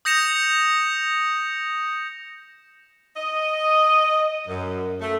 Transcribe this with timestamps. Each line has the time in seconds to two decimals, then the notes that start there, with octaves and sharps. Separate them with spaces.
0.05 D#6 G6 A#6 C#7 E7 F7
3.17 D#5
4.48 F#2
5.01 A3